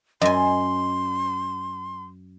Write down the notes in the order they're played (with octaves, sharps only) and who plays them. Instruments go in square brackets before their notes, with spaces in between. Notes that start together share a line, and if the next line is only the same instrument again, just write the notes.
[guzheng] F#2 G#5 [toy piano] D#5 [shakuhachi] C6